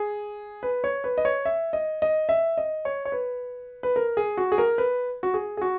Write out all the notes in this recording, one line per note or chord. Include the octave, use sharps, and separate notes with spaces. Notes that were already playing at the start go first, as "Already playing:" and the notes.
Already playing: G#4
B4
C#5
B4
D#5
C#5
E5
D#5
D#5
E5
D#5
C#5
C#5
B4
B4
A#4
G#4
F#4
G#4
A#4
B4
F#4
G#4
G#4
F#4